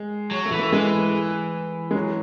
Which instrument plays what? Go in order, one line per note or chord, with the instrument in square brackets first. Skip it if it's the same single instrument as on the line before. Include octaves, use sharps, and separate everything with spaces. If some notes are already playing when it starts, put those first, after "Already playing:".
Already playing: [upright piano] G#3
[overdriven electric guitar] F#3
[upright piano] A3
[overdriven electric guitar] E3
[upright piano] A3
[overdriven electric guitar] E3 [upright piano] G#3
[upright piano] G#3
F#3